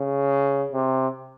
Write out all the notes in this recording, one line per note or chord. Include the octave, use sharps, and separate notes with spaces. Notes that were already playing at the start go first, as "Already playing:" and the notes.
Already playing: C#3
C3